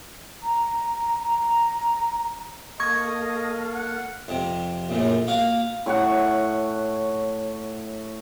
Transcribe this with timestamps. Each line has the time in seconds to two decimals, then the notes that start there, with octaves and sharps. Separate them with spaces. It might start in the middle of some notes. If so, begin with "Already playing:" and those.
0.43 A#5
1.26 A#5
2.80 A#3 A4 D#5 F5 C#6 G#6
3.73 F#5
4.28 F2 C3
4.89 A#1 F#2 A2
5.27 A#3 F#4 F5
5.86 A2 C#5 F#5